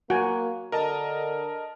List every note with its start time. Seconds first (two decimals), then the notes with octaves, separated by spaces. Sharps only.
0.10 A#3 F#4 G#5
0.72 D3 A#4 D#5 A5